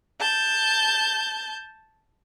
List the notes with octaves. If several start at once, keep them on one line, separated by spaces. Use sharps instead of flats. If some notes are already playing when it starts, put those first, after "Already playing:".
A5 G6